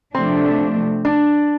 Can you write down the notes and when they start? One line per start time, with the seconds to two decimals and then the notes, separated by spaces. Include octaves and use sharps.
0.14 C3 F3 A3 C4 D4
1.05 D4